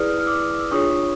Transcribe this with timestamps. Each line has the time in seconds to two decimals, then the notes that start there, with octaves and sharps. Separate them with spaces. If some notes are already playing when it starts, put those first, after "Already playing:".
Already playing: E4 G#4 B4 D5 D#6 F6
0.20 F6
0.26 D6 E6
0.59 E6
0.71 D4 F4 G#4 C#5 C#6 D#6